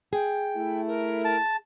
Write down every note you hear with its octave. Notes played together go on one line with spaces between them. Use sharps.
G#4 G5
A3 E4
A#4
A5